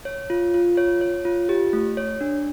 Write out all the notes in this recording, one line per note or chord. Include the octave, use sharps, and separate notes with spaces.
C#5
F4
F4
C#5
C#5
F4
G4
A3
C#5
D4